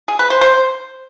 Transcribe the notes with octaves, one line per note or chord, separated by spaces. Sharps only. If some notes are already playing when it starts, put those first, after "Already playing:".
G#4
B4
C5
C5